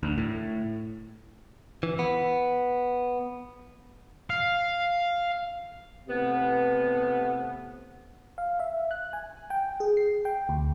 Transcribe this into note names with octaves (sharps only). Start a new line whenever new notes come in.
D2
A2
E3
B3
F5
A2 C3 B3
F5
E5
F#6
G#5
G5
G#4
C7
G5
D2